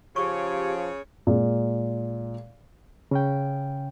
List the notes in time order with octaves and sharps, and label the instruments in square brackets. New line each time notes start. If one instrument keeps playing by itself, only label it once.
[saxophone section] C#3 C#5 [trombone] F3 [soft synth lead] G4 [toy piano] C#6
[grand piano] A#2 G#3
[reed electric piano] C#3 C#4 G5